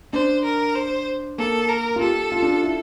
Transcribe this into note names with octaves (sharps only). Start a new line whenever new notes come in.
D4 C5
A#4
C5
A#3 A4
A#4
F4
G4 A4
F4
D4
E4